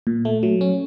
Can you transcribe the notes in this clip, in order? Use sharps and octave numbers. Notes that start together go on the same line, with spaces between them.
A#2
A3
F#3
C#4